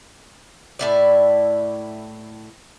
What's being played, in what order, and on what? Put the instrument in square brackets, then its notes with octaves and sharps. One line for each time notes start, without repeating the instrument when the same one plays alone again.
[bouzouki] A2 E4 D5